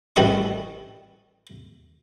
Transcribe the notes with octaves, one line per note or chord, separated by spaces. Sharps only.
A1 E3 G3 E4 D#5 C#6